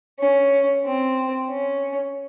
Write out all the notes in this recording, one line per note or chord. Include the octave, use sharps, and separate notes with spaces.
C#4
C4
C#4